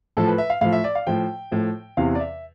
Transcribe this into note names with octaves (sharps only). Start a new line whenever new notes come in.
A2 F3 A4
B4
E5
F5
A2 F3 F5
E5
D5
F5
A2 F3 G5
A2 F3
E2 C3 E3 F5
D5
E5